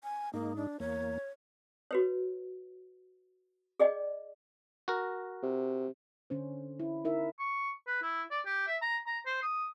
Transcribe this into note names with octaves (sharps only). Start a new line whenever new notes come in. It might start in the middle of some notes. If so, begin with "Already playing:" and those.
G#5
G#2 A#3 D#4
D4
E2 A#3 C#5
F#4 B4 C#5
G#4 D5 D#5 G5
F#4 A#4
C3
D3 C#4 C5
E4
D#4 E4 A#4 E5
C#6
B4
E4
D5
G4
E5
A#5
A#5
C5
D#6